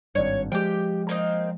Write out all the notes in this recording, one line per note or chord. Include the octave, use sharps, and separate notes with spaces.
G#1 G2 C#5
F3 G#3 G4 G5
A#3 C4 D#4